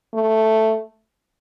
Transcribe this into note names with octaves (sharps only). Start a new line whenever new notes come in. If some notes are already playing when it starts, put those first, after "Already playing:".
A3